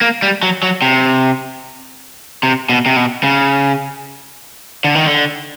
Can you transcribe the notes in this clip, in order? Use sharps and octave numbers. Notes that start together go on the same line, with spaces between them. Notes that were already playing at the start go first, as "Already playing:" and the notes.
A#3
G3
F#3
F#3
C3
C3
B2
C3
B2
C#3
D3
D#3
D3